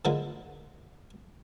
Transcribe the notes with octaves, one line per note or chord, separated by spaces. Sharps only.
D3 E3 F3 G#3 A#3